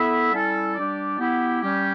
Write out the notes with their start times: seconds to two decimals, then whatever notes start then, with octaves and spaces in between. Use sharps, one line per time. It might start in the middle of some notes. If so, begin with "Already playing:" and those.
Already playing: B3 E4 A4 E5
0.33 G3 C#4 E4 A4
0.75 G3 D4 G4 D5
1.18 B3 E4 G4
1.61 G3 C#4 G4